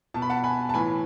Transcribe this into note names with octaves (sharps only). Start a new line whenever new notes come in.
B2 A5
B5
F#5 A5
G#5 B5
A5
A2 E3 G#5 B5